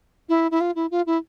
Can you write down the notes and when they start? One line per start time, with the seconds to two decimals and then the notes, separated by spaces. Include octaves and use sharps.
0.29 E4
0.51 E4
0.61 F4
0.76 E4
0.91 F4
1.07 E4